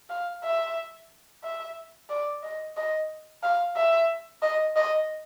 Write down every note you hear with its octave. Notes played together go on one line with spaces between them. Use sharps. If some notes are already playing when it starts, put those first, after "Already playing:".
F5
E5
E5
D5
D#5
D#5
F5
E5
D#5
D#5